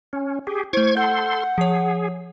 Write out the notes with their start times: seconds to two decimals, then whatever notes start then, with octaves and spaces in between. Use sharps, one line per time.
0.13 C#4
0.47 G4 G#4
0.73 A3 E4 C5 C#6 G#6
0.97 A4 F#5 C6 G6
1.58 F3 G#4 C#5